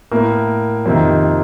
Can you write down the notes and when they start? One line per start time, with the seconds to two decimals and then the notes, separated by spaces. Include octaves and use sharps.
0.11 A2 A#3
0.86 F2 C3 D#3 A#3